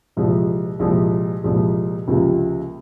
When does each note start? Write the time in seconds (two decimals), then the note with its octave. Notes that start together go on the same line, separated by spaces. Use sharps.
0.17 C2 A#2 F3 G#3
0.79 C2 A#2 F3 G#3
1.44 C2 A#2 F3 G#3
2.08 C#2 C3 F3 A#3 F4